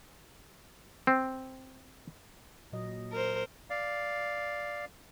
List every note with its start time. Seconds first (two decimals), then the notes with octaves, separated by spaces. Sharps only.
1.07 C4
2.72 A#2 F#3 D#5
3.12 A#4 C5
3.70 D5 F5